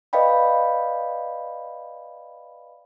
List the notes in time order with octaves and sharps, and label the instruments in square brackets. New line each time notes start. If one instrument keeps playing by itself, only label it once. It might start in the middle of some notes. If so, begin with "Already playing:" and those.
[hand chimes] B4 D5 D#5 F5 G5 B5